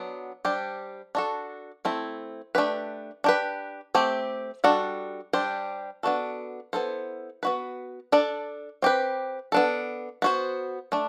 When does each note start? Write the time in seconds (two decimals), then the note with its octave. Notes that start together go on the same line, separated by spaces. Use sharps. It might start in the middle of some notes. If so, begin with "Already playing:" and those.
Already playing: F#3 B3 D4
0.45 G3 D4 G4 C5
1.15 D4 F#4 A4
1.85 A3 C4 E4
2.55 A3 D4 G4 B4
3.24 D4 G4 B4
3.95 A3 C4 G4
4.64 G3 D4 F#4 A4
5.33 G3 D4 G4 C5
6.03 B3 D4 F#4 A4
6.73 B3 E4 A4 C5
7.43 B3 F#4 B4
8.12 D4 A4 D5
8.82 C4 G4 B4
9.52 B3 D4 A4
10.22 B3 F#4 C5
10.92 A3 D4